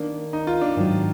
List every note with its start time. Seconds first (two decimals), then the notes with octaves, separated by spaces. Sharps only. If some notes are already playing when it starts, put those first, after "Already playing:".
Already playing: D#3 A#3 D4
0.33 D#4
0.47 F4
0.61 D4
0.76 G#2 D#3 F#3